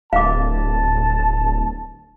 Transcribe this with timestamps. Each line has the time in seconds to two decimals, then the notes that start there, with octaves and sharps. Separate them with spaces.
0.13 D1 F5 A5 D6